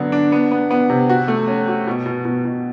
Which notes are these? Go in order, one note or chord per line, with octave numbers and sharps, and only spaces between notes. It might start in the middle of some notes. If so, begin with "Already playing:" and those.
Already playing: D3 F#3 B3
D4
B3
B3
B3
C3
F#4
A3
C#4
F#4
B2
B2
B2
B2